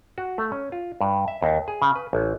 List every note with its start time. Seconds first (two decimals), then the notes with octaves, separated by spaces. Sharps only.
0.18 F#4
0.38 A3
0.52 C#4
0.72 F4
1.01 G2
1.28 E5
1.42 D#2
1.68 G#4
1.82 C#3
1.95 B4
2.13 A1